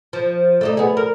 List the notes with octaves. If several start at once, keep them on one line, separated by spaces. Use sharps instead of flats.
F3
A3 D4 D#4
B3 G#4
A#4